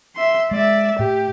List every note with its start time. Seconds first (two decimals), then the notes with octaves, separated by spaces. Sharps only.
0.16 E5 C6
0.51 G#3 D5 E5
0.99 A2 G4